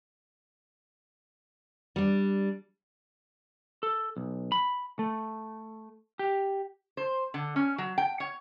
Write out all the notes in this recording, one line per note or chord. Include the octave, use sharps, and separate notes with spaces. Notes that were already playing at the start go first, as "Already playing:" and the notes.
G3 D4
A4
B1
B5
A3
G4
C5
D3
C#4
F#3
G5
C#5